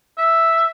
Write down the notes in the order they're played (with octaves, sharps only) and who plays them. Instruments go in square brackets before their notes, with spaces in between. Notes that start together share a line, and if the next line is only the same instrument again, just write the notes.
[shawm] E5